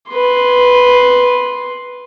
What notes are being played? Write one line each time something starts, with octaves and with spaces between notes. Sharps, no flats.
B4 C6